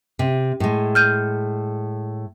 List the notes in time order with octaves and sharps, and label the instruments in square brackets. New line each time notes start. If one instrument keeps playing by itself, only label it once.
[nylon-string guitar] C3
A2 G#3
[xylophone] F6 G6 D#7